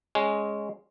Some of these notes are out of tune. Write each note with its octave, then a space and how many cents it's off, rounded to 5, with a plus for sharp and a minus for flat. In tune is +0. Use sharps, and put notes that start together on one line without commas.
G#3 +0 C#4 +0